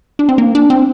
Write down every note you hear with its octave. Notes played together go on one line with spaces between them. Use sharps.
D4
C4
A#3
D4
C4